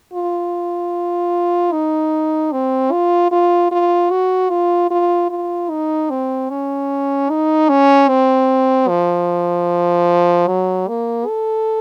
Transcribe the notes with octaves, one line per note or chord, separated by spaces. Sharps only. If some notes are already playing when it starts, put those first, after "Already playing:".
F4
D#4
C4
F4
F4
F4
F#4
F4
F4
F4
D#4
C4
C#4
D#4
C#4
C4
F3
F#3
A#3
A4